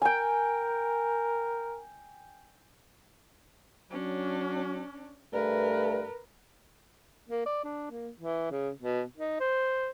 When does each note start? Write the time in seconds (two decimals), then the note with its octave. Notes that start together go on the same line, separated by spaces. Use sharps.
0.02 A#4 G5 G#5
3.91 F#3 C#4 D4
5.33 G2 A3 A#4 B4
7.29 A#3
7.46 D5
7.64 D4
7.91 A#3
8.20 E3
8.51 C#3
8.82 B2
9.17 D#4
9.40 C5